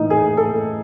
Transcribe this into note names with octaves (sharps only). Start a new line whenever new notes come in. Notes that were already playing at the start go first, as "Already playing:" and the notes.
Already playing: A2 E3 D#4
G#4
A4